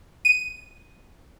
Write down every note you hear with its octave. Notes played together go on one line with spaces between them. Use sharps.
D#7